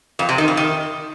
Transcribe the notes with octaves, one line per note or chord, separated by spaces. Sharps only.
F2
C3
D#3
F2
D#3